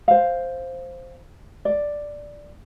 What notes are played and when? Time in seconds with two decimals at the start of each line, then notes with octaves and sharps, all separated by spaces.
0.08 C5 F5
1.65 D5